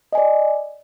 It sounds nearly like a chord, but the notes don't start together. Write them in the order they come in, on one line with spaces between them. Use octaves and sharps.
D#5 G#5 D5